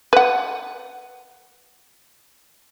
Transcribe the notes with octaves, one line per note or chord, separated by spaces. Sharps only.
B4 F#5